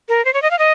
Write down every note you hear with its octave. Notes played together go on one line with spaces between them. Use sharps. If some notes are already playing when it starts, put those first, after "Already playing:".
A#4
C5
C#5
D#5
F5
D#5